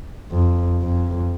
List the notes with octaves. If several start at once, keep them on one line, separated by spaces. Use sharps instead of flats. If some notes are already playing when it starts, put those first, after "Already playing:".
F2
F2